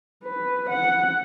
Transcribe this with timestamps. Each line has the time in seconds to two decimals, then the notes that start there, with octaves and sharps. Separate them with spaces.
0.24 B4
0.70 F#5